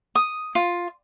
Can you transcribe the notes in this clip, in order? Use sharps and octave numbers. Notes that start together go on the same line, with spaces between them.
D#6
F4